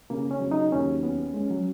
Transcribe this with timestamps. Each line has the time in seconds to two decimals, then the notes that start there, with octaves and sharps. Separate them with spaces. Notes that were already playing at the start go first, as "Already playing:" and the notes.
0.10 C#3 A#3
0.31 C#4
0.40 F#3
0.51 D#4
0.72 D#2 C#4
1.03 B3 C#4
1.34 G#3 C#4
1.51 F#3